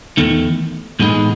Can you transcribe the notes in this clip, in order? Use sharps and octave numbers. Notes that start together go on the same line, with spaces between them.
E2 D#3 A3
A2 E3 G#3 B3 D#4